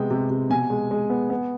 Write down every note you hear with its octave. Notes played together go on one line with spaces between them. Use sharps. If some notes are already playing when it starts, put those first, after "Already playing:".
Already playing: C3 G#3 B3 G5
C3
C3
B2 G#5
G#3
G#3
B3
B3